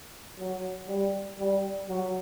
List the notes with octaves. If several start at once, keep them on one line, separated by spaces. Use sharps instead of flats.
F#3
G3
G3
F#3